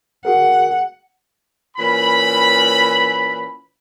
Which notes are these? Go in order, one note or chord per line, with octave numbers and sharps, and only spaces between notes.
F#4 G#4 A#4 F#5
A#2 E3 C#4 B5